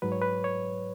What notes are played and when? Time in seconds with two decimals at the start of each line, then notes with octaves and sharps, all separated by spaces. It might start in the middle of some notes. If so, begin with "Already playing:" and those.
0.02 G#2 F#3 B4
0.12 C#5
0.21 B4
0.44 C#5